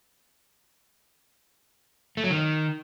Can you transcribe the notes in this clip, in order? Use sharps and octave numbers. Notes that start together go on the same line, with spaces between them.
A3
F#3
D#3